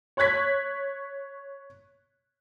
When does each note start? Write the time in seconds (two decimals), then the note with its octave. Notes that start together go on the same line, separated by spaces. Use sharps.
0.17 C#5 C#6 F#6 G#6 B6